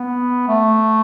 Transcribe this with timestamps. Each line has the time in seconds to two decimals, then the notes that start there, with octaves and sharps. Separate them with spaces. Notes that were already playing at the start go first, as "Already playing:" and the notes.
Already playing: B3
0.48 A3